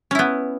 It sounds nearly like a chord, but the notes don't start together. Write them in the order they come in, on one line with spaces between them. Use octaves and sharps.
C#4 E4 B3